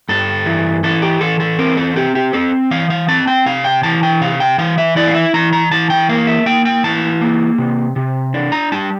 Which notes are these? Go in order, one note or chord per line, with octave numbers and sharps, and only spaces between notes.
G2 A4
E3
E3 A4
G4
E3 A4
A4
C4 A#4
A4
C4 G4
G4
C4 A4
E3 F5
F5
C4 A5
G5
C3 F5
G5
E3 A5
G5
C3 F5
G5
E3 F5
E5
E4 D5
F5
E5
E3 A#5
A#5
E3 A5
G5
A#3 F5
E5
A#3 G5
G5
E3 A5
A#3
C3
C3
D4
A#5
G3 A5